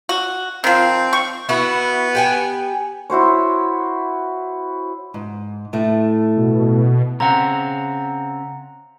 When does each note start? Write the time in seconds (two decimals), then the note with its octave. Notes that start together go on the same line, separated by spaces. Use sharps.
0.09 F#4
0.64 D#3 F3 C4
1.13 C#6
1.49 B3 E4 F#4
2.15 G4 G5 G#5
3.10 E4 F#4 C5 C#5
5.14 G#2
5.73 A2 A3
6.37 B2
7.20 C#3 C4 F#5 A#5